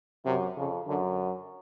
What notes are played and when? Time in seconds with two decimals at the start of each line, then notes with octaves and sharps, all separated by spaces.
0.25 F#2 C3
0.57 F2 C#3
0.87 F#2 D3